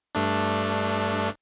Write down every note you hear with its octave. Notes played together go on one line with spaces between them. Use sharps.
G2 A3 D4